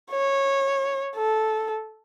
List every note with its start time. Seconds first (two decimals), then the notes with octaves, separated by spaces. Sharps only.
0.11 C#5
1.16 A4